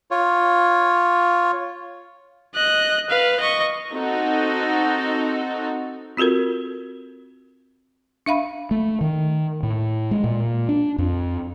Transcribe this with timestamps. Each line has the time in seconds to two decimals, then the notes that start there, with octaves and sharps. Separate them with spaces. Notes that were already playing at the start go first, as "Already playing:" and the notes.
0.11 F4 C#5
2.54 D#5 F#6
3.10 B4 F5
3.40 D#5 C#6
3.91 C4 D#4 F#4 A4
6.17 C4 F4 F#4 A4 A#4
8.26 D4 E5 F5 B5
8.71 A3
9.01 D#3
9.63 A2
10.11 G#3
10.24 A#2
10.69 D4
10.98 F2